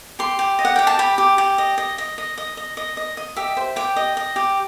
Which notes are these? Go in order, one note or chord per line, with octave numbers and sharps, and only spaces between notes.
G4 C6
G4
D#5
F#5
G4 G5
A5
G4 B5
G4
G4
D#5
D#5
D#5
D#5
D#5
D#5
D#5
D#5
D#5
G4 E5
C5
G4 G5
D#5
D#5
G4